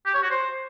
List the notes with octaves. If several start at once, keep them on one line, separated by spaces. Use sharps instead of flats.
G4
C#5
F#4
C5